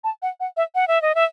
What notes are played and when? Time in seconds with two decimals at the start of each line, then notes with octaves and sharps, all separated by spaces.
0.04 A5
0.22 F#5
0.40 F#5
0.57 E5
0.75 F#5
0.88 E5
1.02 D#5
1.15 E5